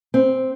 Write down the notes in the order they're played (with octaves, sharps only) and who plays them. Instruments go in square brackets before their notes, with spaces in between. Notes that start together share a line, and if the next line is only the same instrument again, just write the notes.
[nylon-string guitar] C4